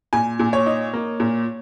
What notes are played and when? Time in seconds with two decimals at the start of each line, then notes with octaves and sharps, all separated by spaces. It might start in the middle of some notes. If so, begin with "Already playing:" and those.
0.13 A#2 G#5
0.39 A#2
0.53 C#5
0.66 D#4
0.93 A#3
1.20 A#2